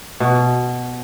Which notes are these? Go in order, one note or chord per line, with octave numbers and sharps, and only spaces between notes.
B2